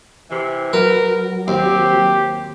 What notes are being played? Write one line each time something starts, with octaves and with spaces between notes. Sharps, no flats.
C3 E3
F#3 A#4 B4
D#2 C4 G4